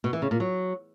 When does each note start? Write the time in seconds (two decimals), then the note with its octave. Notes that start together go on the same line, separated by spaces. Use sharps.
0.04 B2
0.13 E3
0.22 C#3
0.31 A#2
0.40 F#3